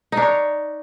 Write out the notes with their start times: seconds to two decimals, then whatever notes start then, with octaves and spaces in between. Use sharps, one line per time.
0.12 D#4
0.17 D4
0.22 C#5